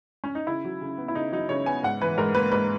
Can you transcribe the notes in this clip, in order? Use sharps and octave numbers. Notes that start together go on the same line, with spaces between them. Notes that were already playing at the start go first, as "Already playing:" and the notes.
C#4
D#4
C#3 E4
F#3
C#3
B3
E4
C#3 D#4
F#3 D#4
C#3 C#5
B3 G#5
G#2 F#5
E3 B4
G#2 A#4
A#3 B4
G#2 B4